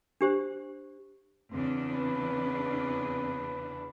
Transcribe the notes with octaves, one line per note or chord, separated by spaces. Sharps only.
D4 G4 C5
E2 C#3 C4 D4
B4